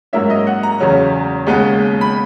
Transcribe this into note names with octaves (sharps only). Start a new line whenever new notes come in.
G#2 F#3 A#3 C#4 E5
D#5
F#5
A#5
E2 C#3 F#3 C#4
D#2 C#3 G#3 B3
B5